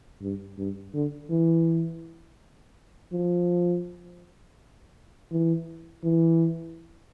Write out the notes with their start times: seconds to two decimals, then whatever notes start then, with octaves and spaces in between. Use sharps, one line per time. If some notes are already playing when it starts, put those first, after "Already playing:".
0.22 G2
0.58 G2
0.94 D3
1.30 E3
3.13 F3
5.31 E3
6.04 E3